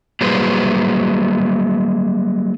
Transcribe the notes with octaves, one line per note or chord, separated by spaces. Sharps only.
F#3 G3 A#3 G#4 B4 C5